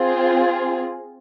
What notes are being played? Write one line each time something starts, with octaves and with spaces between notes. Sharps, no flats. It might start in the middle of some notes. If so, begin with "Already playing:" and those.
Already playing: C4 F4 G#4